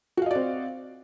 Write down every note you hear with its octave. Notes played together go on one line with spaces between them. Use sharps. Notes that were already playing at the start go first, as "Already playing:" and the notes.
C4 F#4 D5 D#5 F5